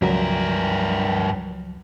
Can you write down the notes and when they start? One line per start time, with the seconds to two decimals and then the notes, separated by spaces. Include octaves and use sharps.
0.02 C#2 G2 F3 F#3 A#4